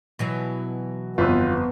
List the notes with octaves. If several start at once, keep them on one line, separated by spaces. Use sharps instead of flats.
B2 E3 F#3
G1 F2 B3 F4 B4 E6